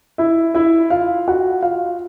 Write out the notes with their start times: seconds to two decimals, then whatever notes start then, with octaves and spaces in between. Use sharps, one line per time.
0.18 E4 E5
0.54 E4 E5
0.90 F4 F5
1.28 F#4 F#5
1.63 F4 F5